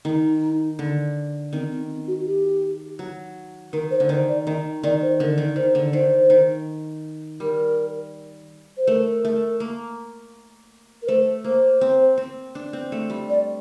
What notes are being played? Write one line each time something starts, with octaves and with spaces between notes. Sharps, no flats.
D#3 D#4
D3
D#3 C4
C4
C4
F#4
G4
F#3
D#3 A#4
C5
D3
D#3 C5
D5
D#3 D#5
D#3 D5
C5
D3 A#4
D#3
D#3 C5
D3
D#3 C5
D#3
G3 A#4
C5
A3 A#4
A3
A#3
A#4
A3 C5
A#3 C5
C4
C4
D4
C4
A3
G3
D5